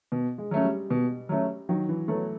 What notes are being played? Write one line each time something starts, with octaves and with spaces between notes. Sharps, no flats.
B2
G#3
F#3 A3 C#4
G3
B2
F#3 A3 C#4
D#3 F#3
E3
F#3 A3 B3